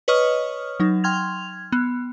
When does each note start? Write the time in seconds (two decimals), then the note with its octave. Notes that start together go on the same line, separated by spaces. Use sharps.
0.08 B4 C#5 D#5 C#6 D#6 F6
0.80 F#3 D#4
1.04 G5 C6 F6 G#6 F7
1.72 B3